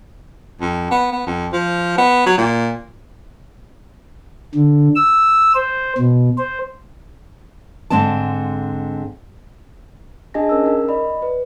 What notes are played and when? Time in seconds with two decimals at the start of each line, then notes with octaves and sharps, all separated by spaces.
0.61 F2
0.91 B3
1.12 B3
1.27 F2
1.53 F3
1.98 B3
2.26 F#3
2.38 A#2
4.55 D3
4.95 E6
5.55 C5
5.98 B2
6.38 C5
7.90 G#2 D3 G#3 C4 D5 A5
10.34 D4 G#4 D#5 G#5 A5 A#6
10.49 C#4 A#4 C#5 E6
10.64 D#4 A#4
10.88 D5 D#5 B5
11.22 B4